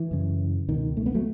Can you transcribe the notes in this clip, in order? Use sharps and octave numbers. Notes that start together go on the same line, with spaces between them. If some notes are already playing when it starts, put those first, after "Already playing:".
Already playing: E3
F#2 C#3
C#2 B2 D#3
A3
B3
F#3 A3